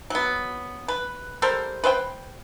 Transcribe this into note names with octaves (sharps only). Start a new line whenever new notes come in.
F#3 B3
B4
G3 A4 A#4 C5
B4 C5 D#5 G5